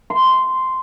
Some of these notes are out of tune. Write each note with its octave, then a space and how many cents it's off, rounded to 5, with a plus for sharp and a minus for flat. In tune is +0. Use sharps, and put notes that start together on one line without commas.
C6 -10